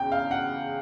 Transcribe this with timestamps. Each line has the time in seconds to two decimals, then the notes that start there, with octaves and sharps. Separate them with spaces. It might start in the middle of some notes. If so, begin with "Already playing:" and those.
Already playing: E2 C#3 G5
0.12 F5
0.31 F#5